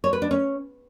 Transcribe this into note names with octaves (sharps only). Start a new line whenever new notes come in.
C#5
B4
D4
C#4